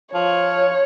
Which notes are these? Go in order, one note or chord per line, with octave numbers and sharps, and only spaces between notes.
F3 C#5